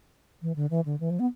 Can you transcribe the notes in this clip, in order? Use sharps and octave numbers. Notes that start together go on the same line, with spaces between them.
E3
D3
E3
D3
E3
F3
B3